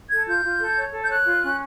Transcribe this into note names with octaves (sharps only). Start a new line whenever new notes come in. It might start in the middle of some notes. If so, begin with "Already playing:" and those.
A4 G#6
F4 G6
F4
A4
C#5
A4
G6
C#5 F#6
F4
C#4